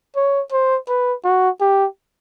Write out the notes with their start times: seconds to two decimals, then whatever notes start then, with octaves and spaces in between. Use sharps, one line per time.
0.16 C#5
0.52 C5
0.88 B4
1.24 F#4
1.60 G4